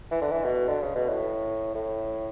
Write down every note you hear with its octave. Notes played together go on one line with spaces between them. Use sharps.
E3
D3
E3
B2
D3
C#3
B2
A2
A2